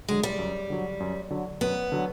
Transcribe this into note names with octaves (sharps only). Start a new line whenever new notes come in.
D3 F#3 G#3
G3
F#2
D3 F#3
F#2
D3 F#3
F#2 B3
D3 F#3